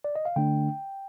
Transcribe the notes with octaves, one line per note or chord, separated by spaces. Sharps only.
D5
D#5
F5
D3 A3 D4 G5